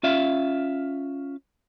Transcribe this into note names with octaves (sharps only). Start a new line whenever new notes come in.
C#4 F4 E5 F5